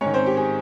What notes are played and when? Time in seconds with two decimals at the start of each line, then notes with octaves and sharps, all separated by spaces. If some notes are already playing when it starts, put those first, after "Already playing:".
0.01 G#2 D#3 C#4 C#5
0.14 C4 C5
0.26 G4
0.37 G#4